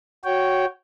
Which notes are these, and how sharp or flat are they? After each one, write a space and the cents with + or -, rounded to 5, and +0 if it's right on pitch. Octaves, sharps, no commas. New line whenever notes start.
F#4 +0 C#5 +0 G5 -15